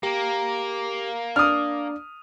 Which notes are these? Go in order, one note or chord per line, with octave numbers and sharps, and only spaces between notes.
A#3 G4
D4 D5 D#6 F6